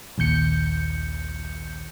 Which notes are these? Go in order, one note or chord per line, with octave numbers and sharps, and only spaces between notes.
A#1 D#2 G6 C#7